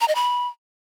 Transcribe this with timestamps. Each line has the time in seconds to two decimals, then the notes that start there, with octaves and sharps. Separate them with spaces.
0.01 A#5
0.08 D#5
0.15 B5